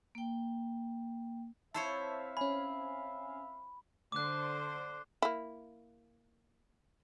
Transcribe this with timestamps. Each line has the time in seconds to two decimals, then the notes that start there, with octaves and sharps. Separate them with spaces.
0.15 A#3 G5
1.74 C4 E4 C5 C#5 E5 F5 A5
2.37 C#4 G#5 B5
4.12 D3 C5 D6 F#6
5.22 A#3 E4